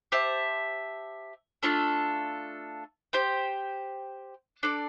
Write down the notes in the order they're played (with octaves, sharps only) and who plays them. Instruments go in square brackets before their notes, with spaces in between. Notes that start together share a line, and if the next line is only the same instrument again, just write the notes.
[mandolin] G4 C5 E5 A5
A3 D4 F4 A4
G4 C5 G5
D4 A4 D5